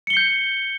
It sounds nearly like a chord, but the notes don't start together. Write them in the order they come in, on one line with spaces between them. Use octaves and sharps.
C#7 G7 C7 G6